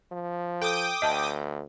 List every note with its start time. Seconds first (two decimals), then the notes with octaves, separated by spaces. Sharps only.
0.12 F3
0.61 A4 G5 D6 D#6
1.02 D2 D#5 A5